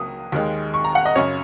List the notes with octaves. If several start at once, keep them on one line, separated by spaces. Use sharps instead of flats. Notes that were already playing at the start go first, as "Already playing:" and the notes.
Already playing: C#2 F#3 A#3 D#6
D#2 D#3 G#3
C#6
A#5
F#5
D#5
F#2 C#3 C#5